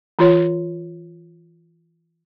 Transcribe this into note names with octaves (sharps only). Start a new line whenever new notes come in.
E3 F4 C#5